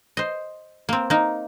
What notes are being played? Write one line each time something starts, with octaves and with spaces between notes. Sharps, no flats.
C5 D#5
A#3 C4
A#3 D#4